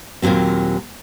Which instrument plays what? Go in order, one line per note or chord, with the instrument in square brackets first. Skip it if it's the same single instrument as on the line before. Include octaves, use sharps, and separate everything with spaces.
[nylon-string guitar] D#2 A#2 D#3 F#3 C4